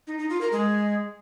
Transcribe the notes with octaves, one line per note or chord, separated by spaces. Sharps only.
D#4
D#4
F4
A#4
G#3